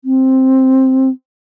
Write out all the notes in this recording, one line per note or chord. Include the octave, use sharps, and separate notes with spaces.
C4